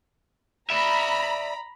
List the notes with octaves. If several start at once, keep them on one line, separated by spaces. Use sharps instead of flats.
D5 E5 A#5 B5